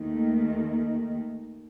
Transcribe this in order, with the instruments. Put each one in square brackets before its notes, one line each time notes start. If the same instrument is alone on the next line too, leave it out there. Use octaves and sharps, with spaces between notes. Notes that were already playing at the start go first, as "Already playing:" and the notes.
Already playing: [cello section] D#2 D#3 A3